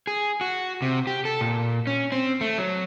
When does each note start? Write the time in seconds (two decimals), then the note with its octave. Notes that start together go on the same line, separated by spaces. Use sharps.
0.07 G#4
0.41 F#4
0.82 C3
1.07 G4
1.25 A4
1.41 A#2
1.87 C#4
2.12 C4
2.41 A3
2.58 F#3